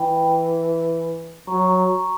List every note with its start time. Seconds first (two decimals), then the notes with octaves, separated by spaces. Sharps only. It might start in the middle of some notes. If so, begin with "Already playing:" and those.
Already playing: E3 G5 B5
1.47 F#3 A#5 C#6